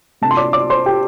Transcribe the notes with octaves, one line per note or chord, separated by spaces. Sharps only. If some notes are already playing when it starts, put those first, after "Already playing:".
C3 A3 D4 A5
C6
D5 D6
D5 D6
C5 C6
G4 G5